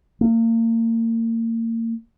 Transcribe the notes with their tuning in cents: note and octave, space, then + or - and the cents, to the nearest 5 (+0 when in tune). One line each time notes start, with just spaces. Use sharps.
A#3 -35